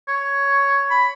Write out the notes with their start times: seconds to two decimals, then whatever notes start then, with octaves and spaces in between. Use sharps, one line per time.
0.08 C#5
0.90 B5